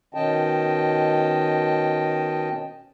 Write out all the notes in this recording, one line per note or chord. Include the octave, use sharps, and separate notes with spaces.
B2 D#3 C#4 D#5 G5 A5